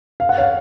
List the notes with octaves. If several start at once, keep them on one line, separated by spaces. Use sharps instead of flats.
F5
F#5
C#5 F5